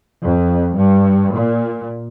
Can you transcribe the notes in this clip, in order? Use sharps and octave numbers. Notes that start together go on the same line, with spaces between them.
F2
G2
A#2